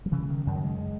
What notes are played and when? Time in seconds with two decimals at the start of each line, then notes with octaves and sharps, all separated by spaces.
0.06 F#3
0.12 C#3 E3
0.29 D#3
0.47 F#2 D#3
0.56 F#3
0.64 G#3